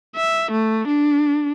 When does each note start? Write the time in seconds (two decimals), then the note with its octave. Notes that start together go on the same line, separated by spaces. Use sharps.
0.16 E5
0.52 A3
0.88 D4